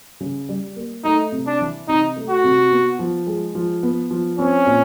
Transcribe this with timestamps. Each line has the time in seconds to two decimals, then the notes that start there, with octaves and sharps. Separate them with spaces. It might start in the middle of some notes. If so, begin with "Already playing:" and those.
0.20 C#3
0.49 G3
0.76 A#3
1.04 A3 D#4
1.32 C3
1.46 D4
1.61 E3
1.88 C3 D#4
2.16 A3
2.30 F#4
2.44 C3
2.71 B3
2.99 F3
3.27 G#3
3.55 F3
3.83 B3
4.11 F3
4.39 C4 C#4
4.66 A#2